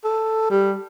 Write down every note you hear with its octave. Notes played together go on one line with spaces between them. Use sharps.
A4
G3